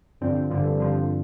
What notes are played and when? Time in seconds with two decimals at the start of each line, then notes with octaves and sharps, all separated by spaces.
0.21 G2 D3 F3 C4
0.50 G2 D3 F3
0.80 G2 D3 F3